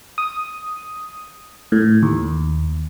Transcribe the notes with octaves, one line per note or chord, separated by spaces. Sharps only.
D#6
A2
D#2